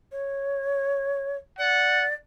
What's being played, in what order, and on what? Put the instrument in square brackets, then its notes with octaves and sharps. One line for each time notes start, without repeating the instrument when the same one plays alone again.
[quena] C#5
[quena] D5 [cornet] F#5